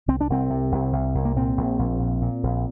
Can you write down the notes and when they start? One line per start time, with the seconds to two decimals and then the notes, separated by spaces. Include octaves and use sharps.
0.08 C2 C4
0.21 D4
0.30 C2 C4
0.50 C3
0.72 C2
0.93 C2
1.15 C2
1.25 A#3
1.36 A#2 C4
1.57 A#1
1.79 A#1
2.00 A#2
2.22 A#2
2.43 A#1